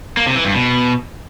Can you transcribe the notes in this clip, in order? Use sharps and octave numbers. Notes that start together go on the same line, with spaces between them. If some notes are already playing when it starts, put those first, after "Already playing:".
A#3
C3
E3
G2
B2